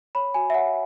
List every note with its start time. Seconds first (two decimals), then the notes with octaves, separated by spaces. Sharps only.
0.15 C#5 B5
0.34 F#4 G#5
0.50 E5
0.54 C#5 F#5